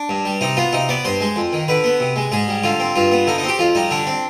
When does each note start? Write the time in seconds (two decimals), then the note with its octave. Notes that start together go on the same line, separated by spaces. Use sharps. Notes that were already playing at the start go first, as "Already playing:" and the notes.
Already playing: D4
0.09 G2
0.25 G3
0.41 C3 D#4
0.57 B3 F4
0.73 C3 D#4
0.89 B3 D5
1.05 G2 C5
1.21 G#3
1.36 F2
1.53 D#3
1.68 D3 B4
1.84 B3
2.00 C3
2.16 G#3
2.32 G#2 G#4
2.48 G3
2.64 D3 F4
2.80 C4
2.95 G2 F4
3.11 B3
3.27 D3 D#4
3.38 D#4
3.43 C4
3.48 G4
3.59 F2 F4
3.75 G3 D#4
3.91 D3 D4
4.07 C4